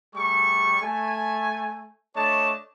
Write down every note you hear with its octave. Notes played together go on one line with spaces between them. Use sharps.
G3 A3 G#4 C#6
A3 G#5
A3 D4 C#5 D#5 A5